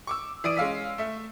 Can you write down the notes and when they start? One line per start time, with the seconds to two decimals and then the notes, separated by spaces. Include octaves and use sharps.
0.07 C#6 D6 E6
0.44 E3 D5 D#6 D7 D#7
0.57 G#3 C#4 F5 E6 B6
0.98 A3 E5